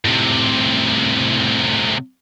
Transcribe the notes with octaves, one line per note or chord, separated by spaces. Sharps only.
A2 C3